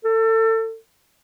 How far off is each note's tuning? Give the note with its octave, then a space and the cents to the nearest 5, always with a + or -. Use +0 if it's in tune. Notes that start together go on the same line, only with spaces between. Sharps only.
A4 +30